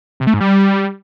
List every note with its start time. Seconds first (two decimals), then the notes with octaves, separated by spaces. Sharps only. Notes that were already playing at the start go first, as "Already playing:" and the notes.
0.20 C3
0.27 A3
0.34 G#2
0.41 G3